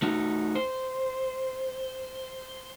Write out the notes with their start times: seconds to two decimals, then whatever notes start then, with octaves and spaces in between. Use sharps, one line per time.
0.02 A3 D#4 F#4
0.55 C5